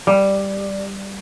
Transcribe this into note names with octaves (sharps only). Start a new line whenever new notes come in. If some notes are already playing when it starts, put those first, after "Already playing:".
G3